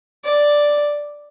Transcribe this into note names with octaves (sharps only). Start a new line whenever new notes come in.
D5